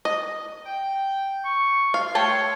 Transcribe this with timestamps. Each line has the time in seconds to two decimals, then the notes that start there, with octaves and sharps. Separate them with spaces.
0.05 D#5
0.66 G5
1.45 C#6
1.94 F#4 A4 F5 C6
2.15 A3 C#5 G5 A5